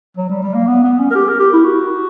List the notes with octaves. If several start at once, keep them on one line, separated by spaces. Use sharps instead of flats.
F#3
G3
G3
A#3
B3
B3
C#4
A#4
G4
A#4
G4
E4
F#4